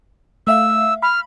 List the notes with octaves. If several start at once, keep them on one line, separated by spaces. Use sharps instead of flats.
A3 E5 F5 E6
B5 F6